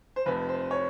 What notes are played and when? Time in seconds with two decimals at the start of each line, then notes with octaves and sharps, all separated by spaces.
0.16 C5
0.26 F1 F2 C3 B4
0.49 C5
0.71 C#5